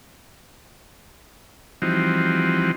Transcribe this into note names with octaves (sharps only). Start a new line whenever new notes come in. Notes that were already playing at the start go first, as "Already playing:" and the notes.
E3 F3 G3 C4 D#4 F#4